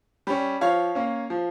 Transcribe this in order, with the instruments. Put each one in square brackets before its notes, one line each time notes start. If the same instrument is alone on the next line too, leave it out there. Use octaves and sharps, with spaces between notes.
[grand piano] G3 C#4
F3 C#5 F5
A#3 C#4
F3